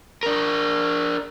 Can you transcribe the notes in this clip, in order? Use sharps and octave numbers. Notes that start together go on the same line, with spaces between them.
D4 A#4